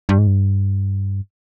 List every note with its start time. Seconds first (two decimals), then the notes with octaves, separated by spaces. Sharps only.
0.09 G2
0.18 G#2
0.27 G2